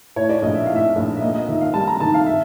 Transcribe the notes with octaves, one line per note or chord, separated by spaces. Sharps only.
A2 C#5
D5
A#1 D#5
E5
A2 F5
E5
A#1
E5
A#3 D#5
D#5
D#3 E5
F5
G3 A5
A#5
D#3 A5
F5
E5